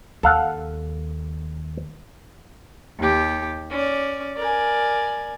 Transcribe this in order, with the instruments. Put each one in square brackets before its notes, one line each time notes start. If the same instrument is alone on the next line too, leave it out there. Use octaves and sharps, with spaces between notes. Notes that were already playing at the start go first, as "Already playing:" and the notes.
[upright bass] D#2 [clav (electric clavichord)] A4 F5 F#5
[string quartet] D#2 G4
C#4 D5
A#4 D5 G#5